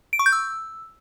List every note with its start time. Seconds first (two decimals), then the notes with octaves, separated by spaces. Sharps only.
0.13 D7
0.19 C#6
0.26 G6
0.32 E6